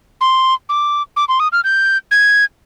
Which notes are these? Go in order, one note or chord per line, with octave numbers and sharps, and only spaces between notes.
C6
D6
D6
C6
D#6
F6
G6
G#6